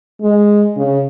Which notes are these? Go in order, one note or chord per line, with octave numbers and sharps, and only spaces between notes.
G#3
C#3